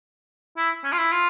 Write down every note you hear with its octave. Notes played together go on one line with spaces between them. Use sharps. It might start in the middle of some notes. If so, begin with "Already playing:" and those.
E4
C#4
F4
E4
F4